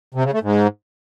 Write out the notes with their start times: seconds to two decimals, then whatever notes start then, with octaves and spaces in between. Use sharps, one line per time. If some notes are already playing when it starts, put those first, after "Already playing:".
0.15 C3
0.24 C#3
0.33 A3
0.43 G#2